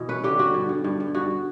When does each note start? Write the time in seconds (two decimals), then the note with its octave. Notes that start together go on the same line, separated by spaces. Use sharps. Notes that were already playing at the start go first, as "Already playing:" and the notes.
Already playing: B2 E3
0.09 C#4 B4
0.24 D3 G4
0.39 D3 F#4
0.54 G2
0.69 G2
0.84 G2
1.00 G2
1.15 G2 F#4